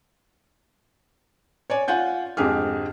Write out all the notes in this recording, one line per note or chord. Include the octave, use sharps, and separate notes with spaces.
C#5 D5 G#5
F4 F#5 G#5 G6
F2 G#2 D3 G4 G#4 F6